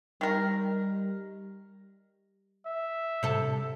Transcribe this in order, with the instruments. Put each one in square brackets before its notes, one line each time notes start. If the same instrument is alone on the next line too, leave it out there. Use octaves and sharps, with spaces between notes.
[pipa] D#3 A#4 [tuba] G3
[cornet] E5
[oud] C3 A4